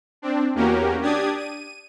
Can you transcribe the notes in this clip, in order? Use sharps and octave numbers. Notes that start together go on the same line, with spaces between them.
C4 D4
E2 A#3 C#4 F#4 G4 A#4
D4 G4 D5 D#6 G#6
D#7